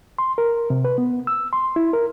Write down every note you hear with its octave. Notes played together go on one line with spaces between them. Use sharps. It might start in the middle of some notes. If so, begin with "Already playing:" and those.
C6
A#4
C3
B4
B3
E6
C6
E4
A#4